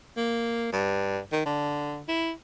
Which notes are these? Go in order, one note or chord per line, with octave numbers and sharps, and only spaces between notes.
A#3
G2
D#3
D3
E4